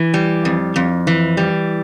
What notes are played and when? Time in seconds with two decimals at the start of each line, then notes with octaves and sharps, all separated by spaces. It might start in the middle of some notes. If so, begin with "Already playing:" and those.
Already playing: E3
0.14 G3
0.45 F2
0.76 F2
1.07 E3
1.37 G3